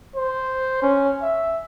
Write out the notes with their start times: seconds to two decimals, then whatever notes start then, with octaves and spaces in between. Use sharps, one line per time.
0.16 C5
0.83 C#4
1.22 E5